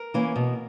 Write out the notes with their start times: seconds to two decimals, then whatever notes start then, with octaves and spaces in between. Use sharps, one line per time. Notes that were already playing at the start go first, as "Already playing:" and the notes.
Already playing: A#4
0.14 E3 A#3 C#4
0.36 B2